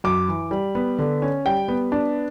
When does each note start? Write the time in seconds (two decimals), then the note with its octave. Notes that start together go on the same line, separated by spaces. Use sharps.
0.04 F#2 D6
0.28 E3
0.51 G3
0.75 B3
0.99 D3
1.22 C#4
1.45 G3 G5
1.68 B3
1.92 D4